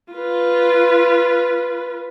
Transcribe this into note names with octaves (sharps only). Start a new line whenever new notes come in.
F4 B4